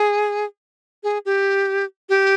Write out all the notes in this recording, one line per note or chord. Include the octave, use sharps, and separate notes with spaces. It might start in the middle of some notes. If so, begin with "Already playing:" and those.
Already playing: G#4
G#4
G4
G4